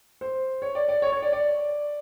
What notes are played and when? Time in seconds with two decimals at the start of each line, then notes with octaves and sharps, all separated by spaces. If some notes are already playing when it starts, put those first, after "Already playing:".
0.21 C5
0.62 C#5
0.75 D5
0.89 D5
1.02 C#5
1.12 C#5
1.22 D5
1.33 D5